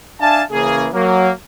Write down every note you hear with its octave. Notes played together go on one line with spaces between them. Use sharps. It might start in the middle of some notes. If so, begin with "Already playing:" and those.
D4 E5 F5 G#5 A5
C#3 E3 A#3 C#4 G#4
F#3 A#3